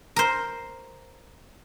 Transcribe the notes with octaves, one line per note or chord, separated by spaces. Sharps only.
A#4 C5